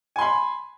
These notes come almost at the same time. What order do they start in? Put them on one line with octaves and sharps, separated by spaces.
G#5 C6 B5